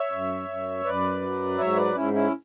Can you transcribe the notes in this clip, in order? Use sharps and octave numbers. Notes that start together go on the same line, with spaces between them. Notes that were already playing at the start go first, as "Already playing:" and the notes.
Already playing: C#5 E5
F#2
F#2
F#2 B4 D5
F#3
G#2 C#5 E5
B4 D5
G#2 C#4 E4
C#4 E4